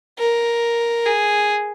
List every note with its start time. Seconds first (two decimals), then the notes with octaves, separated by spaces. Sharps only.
0.18 A#4
1.05 G#4